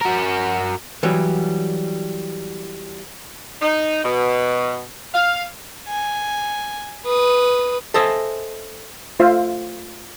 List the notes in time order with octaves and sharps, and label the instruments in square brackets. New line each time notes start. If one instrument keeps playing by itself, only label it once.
[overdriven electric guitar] F#4 A#4
[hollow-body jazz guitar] E3 F#3 G3
[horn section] D#4
B2
F5
[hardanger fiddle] G#5
B4 D#6
[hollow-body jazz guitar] A4 C5 D#5 E5 G#5
[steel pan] A3 F4 C5 E5 F5